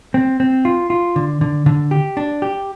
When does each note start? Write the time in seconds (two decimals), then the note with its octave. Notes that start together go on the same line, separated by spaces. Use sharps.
0.14 C4
0.40 C4
0.65 F4
0.90 F4
1.16 D3
1.41 D3
1.66 D3
1.91 G4
2.17 D4
2.42 G4